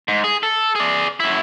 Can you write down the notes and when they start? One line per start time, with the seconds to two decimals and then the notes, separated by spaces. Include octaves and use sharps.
0.08 G#2
0.24 G#4
0.43 A4
0.75 G#4 D5
1.20 F#2 E4